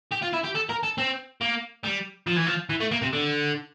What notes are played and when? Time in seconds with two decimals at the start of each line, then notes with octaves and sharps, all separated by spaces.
0.11 G4
0.22 F4
0.33 E4
0.44 G4
0.55 A4
0.69 A#4
0.83 A4
0.98 C4
1.41 A#3
1.84 G3
2.27 F3
2.37 E3
2.47 F3
2.70 E3
2.81 A3
2.92 A#3
3.02 C3
3.13 D3